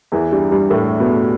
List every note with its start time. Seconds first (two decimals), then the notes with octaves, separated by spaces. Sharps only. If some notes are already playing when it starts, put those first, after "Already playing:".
0.12 E2 E3
0.32 G2 G3
0.51 G2 G3
0.70 A2 A3
1.00 B2 B3